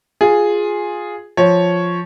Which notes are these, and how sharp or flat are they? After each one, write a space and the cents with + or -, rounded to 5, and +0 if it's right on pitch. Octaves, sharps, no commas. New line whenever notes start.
F4 +15 G#4 +0
F3 +0 C#5 +0